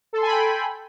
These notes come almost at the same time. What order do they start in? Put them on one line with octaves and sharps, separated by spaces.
A4 C6 G#5 B5 G5